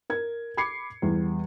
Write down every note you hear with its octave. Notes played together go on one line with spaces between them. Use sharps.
A#4 G#6
B5 D6 G#6 C7 C#7
E2 G3